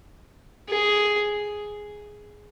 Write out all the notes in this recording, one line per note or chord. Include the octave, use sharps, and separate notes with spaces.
G#4